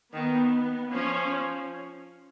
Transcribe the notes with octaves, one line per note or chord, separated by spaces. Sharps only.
D#3 B3
F3 C#4